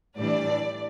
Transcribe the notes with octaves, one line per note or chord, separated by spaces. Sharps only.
A2 E3 G3 D4 D5